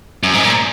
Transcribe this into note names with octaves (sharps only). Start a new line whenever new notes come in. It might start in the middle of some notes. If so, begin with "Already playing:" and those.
F#2
G#2
A#2